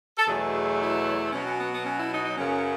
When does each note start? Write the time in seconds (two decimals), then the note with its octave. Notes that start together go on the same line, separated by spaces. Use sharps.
0.17 A4
0.27 E2 B2 F#3 A3 G#4
0.80 E4
1.32 B2 F#3 B3 C#4
1.45 C#4
1.58 B3
1.72 B3
1.85 C#4
1.98 E4
2.11 D#4
2.24 D#4
2.37 F#2 C#3 F#3 B3 C#4